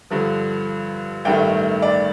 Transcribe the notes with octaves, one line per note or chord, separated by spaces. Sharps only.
G2 D3 F3
A1 G2 D#3 A3 G5
D5